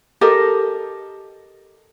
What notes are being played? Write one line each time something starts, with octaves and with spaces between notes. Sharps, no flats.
G4 A4 A#4 D#5